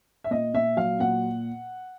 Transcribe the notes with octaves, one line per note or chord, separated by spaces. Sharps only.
E5
A#2 D#5
A#2 E5
F#3 F5
A#2 F#5